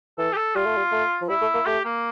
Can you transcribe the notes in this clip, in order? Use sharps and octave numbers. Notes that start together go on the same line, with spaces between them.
E3 A4
G4
A4
G3 F4
A3
G3
A3
F3
G3 E4
A3
A#3
A3 G4
A#3